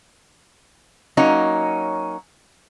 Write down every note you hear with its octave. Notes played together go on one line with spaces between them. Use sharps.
F#3 A#3 C#4 D#4